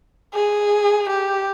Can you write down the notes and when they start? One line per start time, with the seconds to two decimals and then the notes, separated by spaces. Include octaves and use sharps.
0.34 G#4
1.10 G4